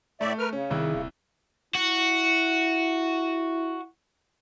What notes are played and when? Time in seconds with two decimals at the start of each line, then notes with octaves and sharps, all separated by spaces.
0.21 A2 A3 D5 E5
0.39 A#4 B4 F6
0.53 C#3 C#4
0.70 C2 D#3 E4
0.95 D#1
1.75 E4 F#4